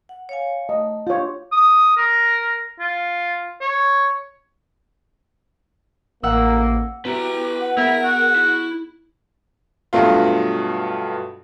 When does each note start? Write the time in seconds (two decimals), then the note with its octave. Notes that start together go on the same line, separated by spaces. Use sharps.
0.09 F#5
0.29 C#5 F5 G#5
0.69 A3 D#5
1.07 D4 F4 G4 C#5
1.52 D#6
1.97 A#4
2.80 F4
3.61 C#5
6.23 A1 A#3 F#5 E6
7.05 B3 E4 F#4 G4 B4 A#5
7.60 F#5
7.77 B3 E4 G#4 A#4
8.04 F#4
8.36 E4
9.93 G2 B2 F#3 A3 F4